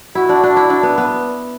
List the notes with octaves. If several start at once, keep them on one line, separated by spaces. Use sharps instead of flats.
E4 F#4
D4
D4
E4
D4
B3
B3